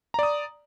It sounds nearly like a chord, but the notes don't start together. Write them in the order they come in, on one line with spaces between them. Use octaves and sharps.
A#5 D5 D#6